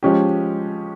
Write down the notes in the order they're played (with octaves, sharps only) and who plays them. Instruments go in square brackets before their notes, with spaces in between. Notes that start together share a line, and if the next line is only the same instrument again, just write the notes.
[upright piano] F3 G#3 C#4 G4